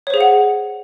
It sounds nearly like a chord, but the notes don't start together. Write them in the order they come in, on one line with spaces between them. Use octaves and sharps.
C#5 C5 G#4 F5 F#5